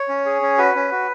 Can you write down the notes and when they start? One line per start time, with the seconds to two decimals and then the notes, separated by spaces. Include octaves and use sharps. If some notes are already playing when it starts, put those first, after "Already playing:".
Already playing: C#5
0.09 C#4
0.26 G#4
0.42 C#4
0.58 F#4 B4
0.75 C#4
0.92 F#4